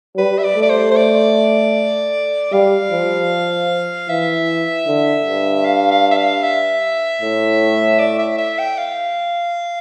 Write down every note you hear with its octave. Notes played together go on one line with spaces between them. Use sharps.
G3 B4
E5
D5
A3
D5
C5
C5
D5
G3 F5
F3
E3 E5
D3
G2
F5
F5
E5
F5
E5
A2
D5
E5
E5
G5
F5